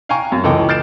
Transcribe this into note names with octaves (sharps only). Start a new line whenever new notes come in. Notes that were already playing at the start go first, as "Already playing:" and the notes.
F5 G5 G#5 A#5 C#6 F6
F#2
C#2 E3 A4 D#5 G5 D6
F6 G6 A6 C7 D7 E7